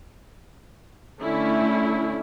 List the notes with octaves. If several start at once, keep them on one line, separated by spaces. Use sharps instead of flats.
D3 A3 C#4 E4